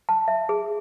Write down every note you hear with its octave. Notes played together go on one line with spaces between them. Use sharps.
A5
E5
G#4